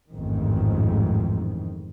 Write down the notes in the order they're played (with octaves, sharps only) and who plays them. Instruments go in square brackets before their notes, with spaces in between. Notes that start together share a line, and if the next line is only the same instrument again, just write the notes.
[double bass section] A1 F2 G#2 D#3